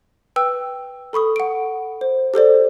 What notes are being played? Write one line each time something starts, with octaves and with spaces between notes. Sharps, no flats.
B4 G5 E6
A4 B5 C#6 D#6
F#5 D7
C5
G4 A4 C5 D5